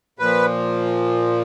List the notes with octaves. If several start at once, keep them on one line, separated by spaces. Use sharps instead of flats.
A#2 F3 B4